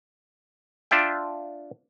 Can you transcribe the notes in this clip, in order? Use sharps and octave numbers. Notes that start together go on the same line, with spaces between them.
D4 F4 D5 E5 G5